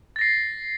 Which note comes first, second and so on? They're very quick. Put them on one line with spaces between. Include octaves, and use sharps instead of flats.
A6 A#6 C7